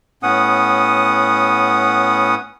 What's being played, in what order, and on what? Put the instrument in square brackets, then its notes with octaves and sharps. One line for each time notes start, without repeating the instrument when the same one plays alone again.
[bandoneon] A2 B3 C#4 F#5 D#6